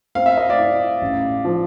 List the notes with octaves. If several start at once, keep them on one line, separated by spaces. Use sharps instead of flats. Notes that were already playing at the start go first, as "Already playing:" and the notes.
C4 F5
E5
D#5
D5 E5
E4
A1
F3